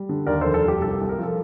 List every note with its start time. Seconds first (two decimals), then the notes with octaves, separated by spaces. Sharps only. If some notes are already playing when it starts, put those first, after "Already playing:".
Already playing: G3
0.09 D3
0.27 D#2 A#4 D5
0.41 F1 A4 C5
0.54 A4
0.64 G3 G4
0.82 C2 A4
1.01 C2
1.09 A#4
1.18 F3 A4